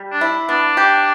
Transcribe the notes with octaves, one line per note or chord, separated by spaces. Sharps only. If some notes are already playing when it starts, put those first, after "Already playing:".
Already playing: G3
D4
E4
B3 D4
G4